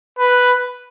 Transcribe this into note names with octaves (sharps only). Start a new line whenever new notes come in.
B4